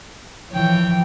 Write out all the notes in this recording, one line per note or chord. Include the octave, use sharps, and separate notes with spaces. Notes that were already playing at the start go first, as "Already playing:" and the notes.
E3 F3 C#5 G5